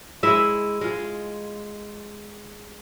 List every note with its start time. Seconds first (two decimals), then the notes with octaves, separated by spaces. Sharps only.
0.23 G#3 E4 E5
0.81 G#3 F4